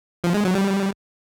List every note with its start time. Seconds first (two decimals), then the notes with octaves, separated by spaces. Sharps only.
0.24 F3
0.34 G#3
0.45 F#3
0.55 G3